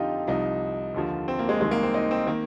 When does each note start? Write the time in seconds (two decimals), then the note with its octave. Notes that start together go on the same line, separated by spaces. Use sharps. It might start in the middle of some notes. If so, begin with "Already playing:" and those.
Already playing: F2 D3 F3 D#4 F4 G4
0.27 C2 C3 F3 D#4
0.94 D#2 D3 F3
1.28 C4
1.39 A#3
1.49 G#3
1.61 C2 C3 D#3 G#3
1.71 A#3
1.83 C4
1.94 D#4
2.11 C4
2.27 D#3 A#3